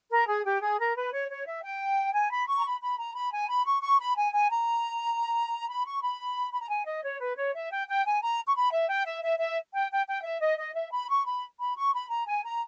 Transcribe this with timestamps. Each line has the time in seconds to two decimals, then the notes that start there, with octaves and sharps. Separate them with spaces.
0.10 A#4
0.27 G#4
0.45 G4
0.61 G#4
0.78 A#4
0.96 B4
1.13 C#5
1.29 C#5
1.46 E5
1.63 G5
2.13 G#5
2.31 B5
2.47 C#6
2.57 A#5
2.65 B5
2.81 B5
2.98 A#5
3.14 B5
3.32 G#5
3.48 B5
3.66 C#6
3.82 C#6
3.99 B5
4.16 G#5
4.33 G#5
4.50 A#5
5.69 B5
5.85 C#6
6.02 B5
6.51 B5
6.60 A#5
6.69 G#5
6.86 D#5
7.03 C#5
7.20 B4
7.37 C#5
7.54 E5
7.70 G5
7.88 G5
8.05 G#5
8.22 A#5
8.47 C#6
8.55 B5
8.72 E5
8.89 G5
9.06 E5
9.23 E5
9.39 E5
9.74 G5
9.91 G5
10.07 G5
10.24 E5
10.40 D#5
10.58 D#5
10.74 E5
10.92 B5
11.09 C#6
11.26 B5
11.59 B5
11.76 C#6
11.93 B5
12.09 A#5
12.26 G#5
12.44 A#5